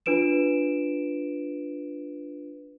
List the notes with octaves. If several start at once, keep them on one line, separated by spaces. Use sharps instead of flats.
D4 F4 B4 D7 E7